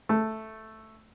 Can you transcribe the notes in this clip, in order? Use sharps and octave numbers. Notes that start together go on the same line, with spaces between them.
A3